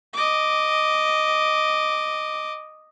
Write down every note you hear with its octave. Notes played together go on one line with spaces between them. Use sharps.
D#5 D6